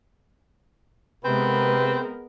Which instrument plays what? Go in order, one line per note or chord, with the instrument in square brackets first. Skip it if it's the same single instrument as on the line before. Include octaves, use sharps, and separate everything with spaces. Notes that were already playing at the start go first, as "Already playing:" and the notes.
[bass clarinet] C3 [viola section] G#3 B3 A#4 [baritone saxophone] C4 [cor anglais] B4